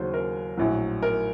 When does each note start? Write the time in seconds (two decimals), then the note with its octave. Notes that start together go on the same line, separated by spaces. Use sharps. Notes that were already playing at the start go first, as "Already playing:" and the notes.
Already playing: D#2 C#3 F#3 C5
0.14 A#4
0.57 A#1 A2 F#3
1.03 A#4